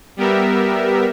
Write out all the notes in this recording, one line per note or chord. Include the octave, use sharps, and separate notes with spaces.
G3 B3 G4 A#4 E5